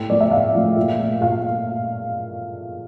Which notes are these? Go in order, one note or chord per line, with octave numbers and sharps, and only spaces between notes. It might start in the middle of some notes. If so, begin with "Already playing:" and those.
Already playing: A2 G5
F3 A3 D5
E5
A2 F5
F3 A3
A#2
A3
A#2 F5